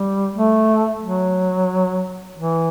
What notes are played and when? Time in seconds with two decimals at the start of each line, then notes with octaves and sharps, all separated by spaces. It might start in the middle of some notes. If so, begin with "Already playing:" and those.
Already playing: G3
0.35 A3
1.02 F#3
2.37 E3